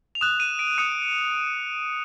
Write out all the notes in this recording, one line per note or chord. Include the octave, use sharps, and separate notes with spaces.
F7
D#6 F#6 E7
D#7
D7
D#6 F#6 C#7